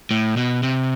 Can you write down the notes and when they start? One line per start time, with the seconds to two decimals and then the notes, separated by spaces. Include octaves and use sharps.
0.11 A2
0.37 B2
0.63 C3